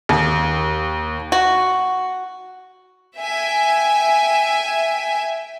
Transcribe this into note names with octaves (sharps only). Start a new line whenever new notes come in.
D#2
F#4
E5 G5 G#5